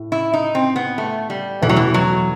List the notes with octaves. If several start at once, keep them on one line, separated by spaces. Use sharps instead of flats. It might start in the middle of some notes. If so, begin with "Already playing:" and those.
Already playing: A2
E4
D#4
C4
B3
A3
G3
E2 B2 E3 A3
F#3
E3
F#3